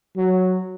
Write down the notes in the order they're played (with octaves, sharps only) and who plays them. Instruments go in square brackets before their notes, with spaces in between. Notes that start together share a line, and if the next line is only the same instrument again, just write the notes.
[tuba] F#3